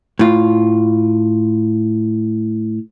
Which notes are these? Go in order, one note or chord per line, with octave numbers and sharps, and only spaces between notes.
A2 F4